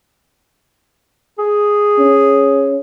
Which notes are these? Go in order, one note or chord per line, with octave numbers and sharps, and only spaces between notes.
G#4
C#4